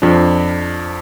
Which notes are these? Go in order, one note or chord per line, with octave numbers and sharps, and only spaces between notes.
F2 F3 D4